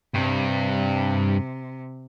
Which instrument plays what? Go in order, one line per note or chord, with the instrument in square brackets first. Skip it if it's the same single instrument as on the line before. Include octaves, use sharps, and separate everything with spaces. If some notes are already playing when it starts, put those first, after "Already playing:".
[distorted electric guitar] G2 [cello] C3